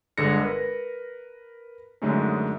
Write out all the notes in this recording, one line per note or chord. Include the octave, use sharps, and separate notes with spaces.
G1 D3 G#3 G#4 A#6 C#7
A#4 B4
F#2 D3 G#3 A3 C#4 D#4